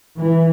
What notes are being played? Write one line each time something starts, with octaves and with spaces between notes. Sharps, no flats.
E3